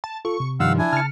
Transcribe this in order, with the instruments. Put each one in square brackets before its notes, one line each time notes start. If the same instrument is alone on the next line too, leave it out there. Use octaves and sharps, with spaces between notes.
[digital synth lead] A5
[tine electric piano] F4 A4 [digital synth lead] C#6
[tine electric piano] C3
[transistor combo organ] G2 D#3 [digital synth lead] F3 [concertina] F5 F#5 E6
[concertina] D4 E4 G#5
[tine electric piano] C#3 C#7 [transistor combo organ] A5 [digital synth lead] F6